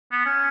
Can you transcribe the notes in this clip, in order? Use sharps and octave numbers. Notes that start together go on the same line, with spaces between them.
B3
C#4